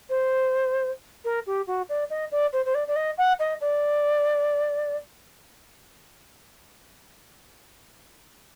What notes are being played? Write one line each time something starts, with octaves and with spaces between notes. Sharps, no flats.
C5
A#4
G4
F#4
D5
D#5
D5
C5
C5
D5
D5
D#5
F#5
D#5
D5